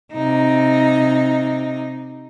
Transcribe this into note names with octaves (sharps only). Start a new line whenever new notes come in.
C3 D#4